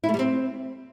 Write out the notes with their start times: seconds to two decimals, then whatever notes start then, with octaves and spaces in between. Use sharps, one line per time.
0.04 E4
0.09 A3
0.14 G3
0.19 C4